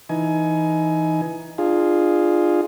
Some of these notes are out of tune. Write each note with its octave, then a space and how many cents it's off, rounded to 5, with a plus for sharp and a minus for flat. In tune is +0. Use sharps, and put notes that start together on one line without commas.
E3 +0 D#4 +5 G#5 +20
D4 +35 F4 +0 G#4 +0